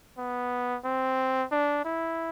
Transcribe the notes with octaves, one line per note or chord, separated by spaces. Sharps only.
B3
C4
D4
E4